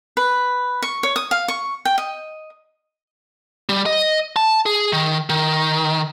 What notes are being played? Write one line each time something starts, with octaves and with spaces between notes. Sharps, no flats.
B4
C#6
C#5
D#6
F5
C#6
G5
D#5
G3
D#5
A5
G#4
D#3
D#3